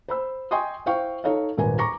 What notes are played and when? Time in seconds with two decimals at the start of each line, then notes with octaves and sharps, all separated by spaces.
0.08 C5 B5 E6
0.51 D#5 G5 G#5 C6 C#6 D#6
0.86 E4 C5 F5 G5 C#6
1.24 D#4 A4 C#5 D#5 F5
1.57 D#1 G#1 A#4 B4 G#5
1.79 A#5 C#6 D6 A#6